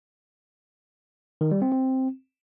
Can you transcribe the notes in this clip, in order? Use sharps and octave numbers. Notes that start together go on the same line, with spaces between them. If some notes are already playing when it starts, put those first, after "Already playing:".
D#3
G3
C4
C4